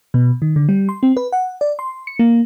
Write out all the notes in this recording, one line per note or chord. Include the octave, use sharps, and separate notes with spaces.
B2
D#3
D3
G3
C6
C4
B4
F#5
D5
C6
C#7
A#3